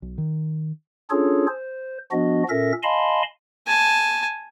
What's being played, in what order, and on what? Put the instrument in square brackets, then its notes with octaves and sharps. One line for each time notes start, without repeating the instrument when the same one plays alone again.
[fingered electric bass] B1
D#3
[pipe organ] C#4 D4 F4 G#4 A4 C#5
C5
F3 B3 D4 F#4 D#5
A#2 C#4 A4 A#4 E5 A#6
D#5 F5 G#5 A5 B5 C6
[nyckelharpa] G#5 A5